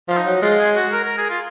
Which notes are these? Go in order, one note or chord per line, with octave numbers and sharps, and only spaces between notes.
F3 F4
D#4
F#3
G#3 F4
G#4
F#4
A#4
A#4
G#4
F4